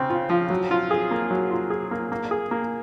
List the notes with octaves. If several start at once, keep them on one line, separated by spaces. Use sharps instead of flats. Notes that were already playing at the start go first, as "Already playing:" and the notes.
Already playing: C#3 C4
F4
F3
F#3
F4
G#4
A#3
F#3
F4
G#4
A#3
A#3
G#4
A#3